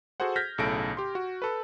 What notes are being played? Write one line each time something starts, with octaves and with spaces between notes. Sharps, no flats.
F#4 G#4 A4 C5 F#5
F6 G6 G#6 A#6 B6
B1 A2 C#3 A4 A#6 D7
G4 C6
F#4
A4 B4